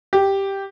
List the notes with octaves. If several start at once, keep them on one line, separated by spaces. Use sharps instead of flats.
G4